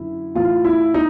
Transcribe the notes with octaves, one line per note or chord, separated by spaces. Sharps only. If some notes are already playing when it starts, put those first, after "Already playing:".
Already playing: F#2 D3 E4
A2 E3 F4
E4
D#4